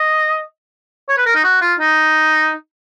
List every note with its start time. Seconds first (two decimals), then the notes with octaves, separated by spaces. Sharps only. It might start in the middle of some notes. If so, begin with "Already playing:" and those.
Already playing: D#5
1.09 C#5
1.18 B4
1.26 A#4
1.35 D#4
1.44 F#4
1.62 F4
1.80 D#4